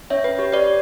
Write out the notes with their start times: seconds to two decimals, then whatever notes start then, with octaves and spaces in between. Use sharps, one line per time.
0.10 C#4 C#5 E5
0.24 B4
0.39 G4 C#5
0.52 B4 D5